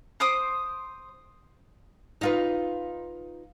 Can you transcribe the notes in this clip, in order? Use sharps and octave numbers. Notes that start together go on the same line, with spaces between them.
C5 D6 D#6
D#4 F4 B4